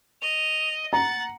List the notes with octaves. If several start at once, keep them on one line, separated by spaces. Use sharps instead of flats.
D#5 F7
F#5 A#5 A6